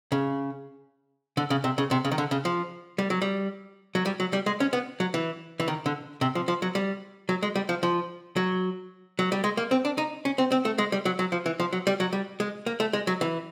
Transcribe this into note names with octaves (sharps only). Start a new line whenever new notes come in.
C#3
D3
C#3
C3
C#3
C3
C#3
D#3
D3
C#3
F3
G3
F#3
G3
F#3
G3
F#3
G3
G#3
C#4
B3
F#3
E3
E3
D#3
D3
C3
F3
F3
F#3
G3
F#3
G#3
G3
F3
F3
F#3
F#3
G3
G#3
A#3
C4
D4
D#4
C#4
C4
C4
A3
G#3
G3
F#3
F#3
F3
E3
F3
F#3
G3
F#3
G3
G#3
A#3
A3
G#3
F#3
E3